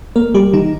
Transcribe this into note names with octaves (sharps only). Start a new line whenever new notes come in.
A#3 A#4
G3 G4
D#3 D#4